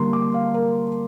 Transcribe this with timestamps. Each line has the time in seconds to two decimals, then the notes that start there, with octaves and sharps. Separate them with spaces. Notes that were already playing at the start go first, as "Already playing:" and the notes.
Already playing: D3 G3 A#3 A#5 C6
0.13 D6
0.34 F5
0.54 A#4